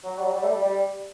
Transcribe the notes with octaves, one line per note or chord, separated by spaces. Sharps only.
F#3
G3
F#3
G3
A3
G3
G3